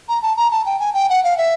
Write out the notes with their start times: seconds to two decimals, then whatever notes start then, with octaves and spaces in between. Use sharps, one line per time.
0.09 A#5
0.22 A5
0.37 A#5
0.51 A5
0.66 G5
0.80 G#5
0.94 G5
1.09 F#5
1.24 F5
1.38 E5